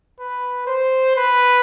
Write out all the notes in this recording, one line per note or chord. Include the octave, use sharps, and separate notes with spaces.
B4
C5
B4